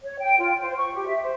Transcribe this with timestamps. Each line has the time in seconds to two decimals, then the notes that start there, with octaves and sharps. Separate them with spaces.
0.02 C#5
0.19 G5
0.39 F4
0.60 C5
0.77 C#6
0.94 G4
1.07 E5
1.21 C5